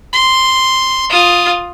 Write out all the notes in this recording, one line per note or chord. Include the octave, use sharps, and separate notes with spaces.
C6
F4 D#6